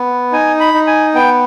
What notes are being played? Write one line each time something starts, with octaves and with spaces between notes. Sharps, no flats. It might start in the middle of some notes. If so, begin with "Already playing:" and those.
Already playing: B3
D#4 G#5
B5
D#4
G#5
B3 G5